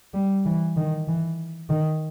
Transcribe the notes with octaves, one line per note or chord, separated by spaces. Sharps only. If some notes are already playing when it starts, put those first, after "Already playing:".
G3
E3
D#3
E3
D#3